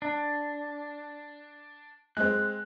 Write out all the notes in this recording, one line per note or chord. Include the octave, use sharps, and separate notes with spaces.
D4
G#3 C4 F#6